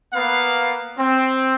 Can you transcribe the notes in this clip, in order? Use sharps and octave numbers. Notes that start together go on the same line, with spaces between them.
A#3 B3 B4 F5
C4